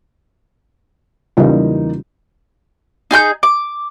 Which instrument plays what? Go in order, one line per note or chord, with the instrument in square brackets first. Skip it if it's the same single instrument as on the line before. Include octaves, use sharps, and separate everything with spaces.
[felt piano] E2 A#3 D#4 [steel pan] C#3 G3 F4
[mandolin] D#4 G#4 C6 G6
D6